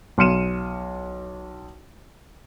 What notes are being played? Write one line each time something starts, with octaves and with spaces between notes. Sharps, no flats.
B1 C6 F6 C#7 D#7 E7